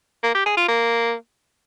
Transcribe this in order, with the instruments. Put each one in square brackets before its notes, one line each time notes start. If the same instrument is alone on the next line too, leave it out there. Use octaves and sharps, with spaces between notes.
[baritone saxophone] A#3
G4
G#4
F4
A#3